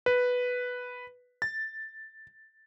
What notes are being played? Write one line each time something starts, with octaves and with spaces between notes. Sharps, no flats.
B4
A6